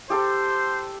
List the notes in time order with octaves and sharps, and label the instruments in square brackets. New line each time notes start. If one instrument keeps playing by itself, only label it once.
[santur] G4 A4 [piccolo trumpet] C5